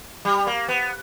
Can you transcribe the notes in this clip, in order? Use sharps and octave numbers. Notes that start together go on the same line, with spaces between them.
G3
A#3
B3